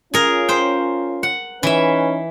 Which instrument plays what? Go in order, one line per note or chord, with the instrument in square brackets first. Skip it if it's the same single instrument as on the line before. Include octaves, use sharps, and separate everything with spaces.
[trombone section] C#4 F4 [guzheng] G#4 A#4
[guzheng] C5 G5
F#5
[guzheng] E3 E5 [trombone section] C#4 D#4 B4